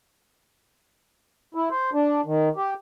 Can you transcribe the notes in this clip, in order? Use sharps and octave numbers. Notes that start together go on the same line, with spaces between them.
E4
C5
D4
D#3
G4